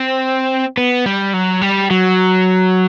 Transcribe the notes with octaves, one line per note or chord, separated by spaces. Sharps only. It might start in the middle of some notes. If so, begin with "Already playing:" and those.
Already playing: C4
B3
G3
F#3
G3
F#3